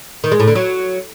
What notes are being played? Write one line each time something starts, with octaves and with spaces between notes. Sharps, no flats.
D#3
G#3
A2
D3
F#3